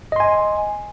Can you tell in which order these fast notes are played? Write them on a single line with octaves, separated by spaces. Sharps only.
D#5 C6 G#5